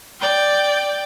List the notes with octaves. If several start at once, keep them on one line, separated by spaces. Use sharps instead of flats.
D5 G5